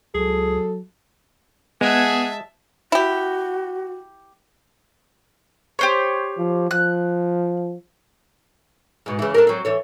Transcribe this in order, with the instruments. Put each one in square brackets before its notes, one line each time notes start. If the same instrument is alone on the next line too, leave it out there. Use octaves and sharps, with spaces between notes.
[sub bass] C#2 [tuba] F#3 [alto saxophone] G#4 [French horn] A4
[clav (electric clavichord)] G#3 [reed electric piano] B3 G#6 [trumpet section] G#4 F#5 [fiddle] E5 A5
[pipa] E4 G4 [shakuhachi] F#4
[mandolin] G4 C5 C#5
[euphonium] F3
[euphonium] F3 [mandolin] F#6
[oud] G#2 B2
C#3 E3
D4 A4 A#4
F#3 C4
E3 A4 C#5